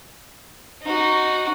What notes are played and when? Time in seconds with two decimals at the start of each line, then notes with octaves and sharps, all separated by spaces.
0.83 D#4 F#4